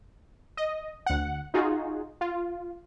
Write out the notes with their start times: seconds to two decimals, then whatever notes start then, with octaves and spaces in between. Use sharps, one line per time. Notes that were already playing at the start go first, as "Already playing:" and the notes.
0.57 D#5
1.06 D2 F#5
1.54 D#4 F4 F#4 G#4
2.21 F4